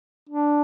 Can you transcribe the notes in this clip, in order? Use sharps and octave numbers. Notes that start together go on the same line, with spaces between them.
D4